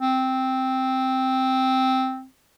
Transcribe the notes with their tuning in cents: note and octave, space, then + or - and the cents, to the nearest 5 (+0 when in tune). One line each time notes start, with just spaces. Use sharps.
C4 +0